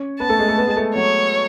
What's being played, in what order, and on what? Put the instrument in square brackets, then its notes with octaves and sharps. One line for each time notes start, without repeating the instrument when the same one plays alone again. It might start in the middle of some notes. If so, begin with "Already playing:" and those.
Already playing: [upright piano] C#4 C#5
[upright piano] B3 B4 [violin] A5
[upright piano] A3 A4
G#3 G#4
A3 A4
B3 B4
G#3 G#4
A3 A4
[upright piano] F#3 F#4 [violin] C#5